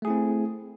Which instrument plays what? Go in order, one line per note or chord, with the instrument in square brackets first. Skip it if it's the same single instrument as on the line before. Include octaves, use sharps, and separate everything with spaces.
[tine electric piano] A3
G#4
E4
C4